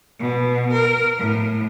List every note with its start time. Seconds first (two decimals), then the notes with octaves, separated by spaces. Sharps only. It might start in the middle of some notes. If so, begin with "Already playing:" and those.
0.19 B2
0.72 A#4
1.18 A2